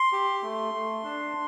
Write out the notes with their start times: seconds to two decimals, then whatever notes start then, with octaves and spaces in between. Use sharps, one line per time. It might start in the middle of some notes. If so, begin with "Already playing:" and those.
Already playing: C6
0.12 G4
0.42 A3
0.74 A3
1.04 D4